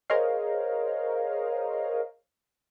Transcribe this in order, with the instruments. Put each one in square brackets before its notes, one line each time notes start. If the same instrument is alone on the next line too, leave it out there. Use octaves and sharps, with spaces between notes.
[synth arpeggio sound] G#4 A#4 C5 C#5 D#5 F5